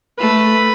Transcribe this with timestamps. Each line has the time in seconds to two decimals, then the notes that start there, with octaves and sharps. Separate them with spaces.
0.19 A3 B4